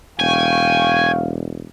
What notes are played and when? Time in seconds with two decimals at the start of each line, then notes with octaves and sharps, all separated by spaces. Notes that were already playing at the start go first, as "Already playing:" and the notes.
0.20 E1 F5 G5 G#5 C#6